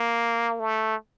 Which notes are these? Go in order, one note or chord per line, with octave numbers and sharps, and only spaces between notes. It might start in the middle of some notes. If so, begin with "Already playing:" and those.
Already playing: A#3
A3